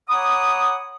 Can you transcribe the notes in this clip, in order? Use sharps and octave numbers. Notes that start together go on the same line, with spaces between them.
C#5 F#5 A#5 B5 D6 D#6